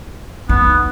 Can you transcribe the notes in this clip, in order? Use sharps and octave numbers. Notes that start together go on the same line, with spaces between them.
B3 D#4